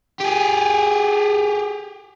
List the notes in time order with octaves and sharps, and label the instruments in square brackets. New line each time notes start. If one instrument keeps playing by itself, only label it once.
[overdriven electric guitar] G4 G#4